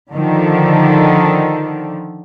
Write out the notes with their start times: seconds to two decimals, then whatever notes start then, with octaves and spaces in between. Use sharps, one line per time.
0.12 D3 D#3 F3